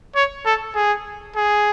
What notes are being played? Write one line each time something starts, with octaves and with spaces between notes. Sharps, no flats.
C#5
A4
G#4
G#4